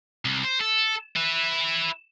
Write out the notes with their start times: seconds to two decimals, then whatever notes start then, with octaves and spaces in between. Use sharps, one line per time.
0.25 C2
0.44 C5
0.60 A4
1.16 E4 B4